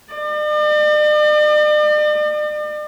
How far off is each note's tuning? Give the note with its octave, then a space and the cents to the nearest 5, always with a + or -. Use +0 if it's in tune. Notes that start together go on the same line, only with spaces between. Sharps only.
D5 +45